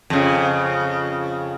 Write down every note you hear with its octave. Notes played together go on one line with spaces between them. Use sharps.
F2 C#3